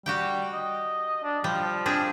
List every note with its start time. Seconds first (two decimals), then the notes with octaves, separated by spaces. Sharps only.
0.06 G3 F#4 G4 G5
0.53 D#5
1.23 D4
1.44 F3 G3
1.86 C4 D4 G#4